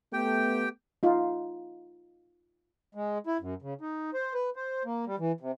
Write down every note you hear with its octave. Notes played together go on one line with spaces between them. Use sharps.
A3 B3 G4 G5
D#4 F4
G#3
E4
F#2
C#3
D#4
C5
B4
C5
A#3
G3
E3
C3